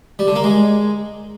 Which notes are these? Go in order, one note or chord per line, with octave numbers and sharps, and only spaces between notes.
G3
D3
A#3
G#3